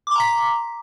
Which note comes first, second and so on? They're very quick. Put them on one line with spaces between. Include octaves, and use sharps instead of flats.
D6 C6 A#5 B6